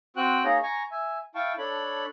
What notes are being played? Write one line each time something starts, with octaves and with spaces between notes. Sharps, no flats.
C4 F#4 G5 F#6
A#3 D#4 G#4 C#5 D#5
G#5 A#5 C#6
E5 G#5
E4 F5 G5 A5 C#6
D4 A4 C#5 B5